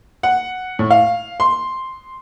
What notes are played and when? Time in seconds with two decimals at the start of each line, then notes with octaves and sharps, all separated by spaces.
0.23 F#5
0.79 A2
0.90 F5
1.40 C6